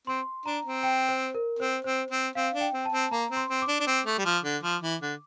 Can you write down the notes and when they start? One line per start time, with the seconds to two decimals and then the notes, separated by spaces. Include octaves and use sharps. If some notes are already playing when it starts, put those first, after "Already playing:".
0.07 C4 C6
0.46 D4 A#5
0.65 C4
0.83 G5
1.09 C5
1.35 A#4
1.59 C4 C5
1.84 C4 C5
2.11 C4
2.35 C4 F5
2.54 D4
2.61 G5
2.73 C4
2.85 A5
2.92 C4
3.11 A#3 A#5
3.30 C4
3.36 C6
3.49 C4
3.62 D6
3.68 D4
3.80 D4
3.87 C4
4.06 A3
4.18 G3
4.25 F3
4.44 D3
4.63 F3
4.82 E3
5.01 D3